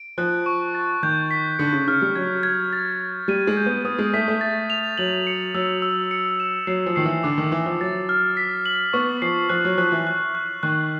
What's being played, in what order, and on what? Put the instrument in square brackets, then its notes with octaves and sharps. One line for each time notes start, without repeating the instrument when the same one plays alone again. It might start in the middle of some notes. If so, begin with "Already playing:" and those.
Already playing: [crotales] D7
[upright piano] F3 [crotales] F#6
[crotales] C#6
A6
[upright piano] D#3 [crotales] G6
[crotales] B6
[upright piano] D3 [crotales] C#7
[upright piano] C#3
[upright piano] C#3 [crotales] F6
[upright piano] G3
[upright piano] F#3 [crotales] G#6
[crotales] G#6
A6
A6
[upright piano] G3 [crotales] D#7
[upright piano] G#3
[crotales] G6
[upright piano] B3
[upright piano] B3 [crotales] D#6
[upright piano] G#3
[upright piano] A3 [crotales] B6
[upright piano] A3
[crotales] A6
F7
[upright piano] F#3 [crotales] F#7
[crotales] C#7
[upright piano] F#3 [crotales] E6
[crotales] E6
C#7
E7
[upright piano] F#3 [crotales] C7
[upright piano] F3
[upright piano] D#3 [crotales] C7
[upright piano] E3
[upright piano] D3 [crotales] D6
[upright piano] D#3
[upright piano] E3 [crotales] D6
[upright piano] F3
[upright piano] F#3 [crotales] A6
[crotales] F6
B6
F#7
[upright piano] B3 [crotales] C#6
[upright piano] F3 [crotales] C7
[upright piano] F3 [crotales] F#6
[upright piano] F#3
[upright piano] F3 [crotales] F#6
[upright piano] E3
[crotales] F#6
F#6
[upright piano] D#3 [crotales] F#6